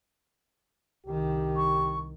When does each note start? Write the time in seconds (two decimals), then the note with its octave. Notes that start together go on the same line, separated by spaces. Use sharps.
1.06 C2 D#3 G4
1.57 C#6